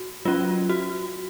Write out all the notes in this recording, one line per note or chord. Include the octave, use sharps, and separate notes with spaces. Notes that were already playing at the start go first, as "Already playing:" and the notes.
Already playing: F#4
F#3 C#4 F4
F#4